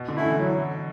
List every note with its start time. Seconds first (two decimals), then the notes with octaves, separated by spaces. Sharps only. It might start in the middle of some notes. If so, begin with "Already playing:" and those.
Already playing: B2
0.08 D3
0.16 A3 C#4 E4
0.24 E3
0.38 F#3